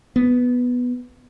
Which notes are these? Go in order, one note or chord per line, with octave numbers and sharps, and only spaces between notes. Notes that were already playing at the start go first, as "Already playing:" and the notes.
B3